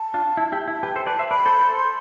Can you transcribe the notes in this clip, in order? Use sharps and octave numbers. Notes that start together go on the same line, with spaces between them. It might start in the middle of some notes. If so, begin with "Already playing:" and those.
Already playing: A5
D4 F4
E4
E4 G4
E4
A5
G4 B4 G5
A4 C5
B4 D5 A5
C5 E5
B4 D5 B5
A4 C5
A4 C5
C6